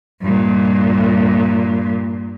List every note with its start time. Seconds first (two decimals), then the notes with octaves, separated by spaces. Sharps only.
0.21 G2 A#2